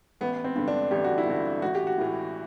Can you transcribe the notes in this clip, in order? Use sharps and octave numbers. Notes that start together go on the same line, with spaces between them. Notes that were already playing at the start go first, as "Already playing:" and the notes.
A1 B3
C4
G2 D3
D4
A1 G4
F#4
E4
G2 D3 F#4
A1 F#4
G4
F#4
A2 E3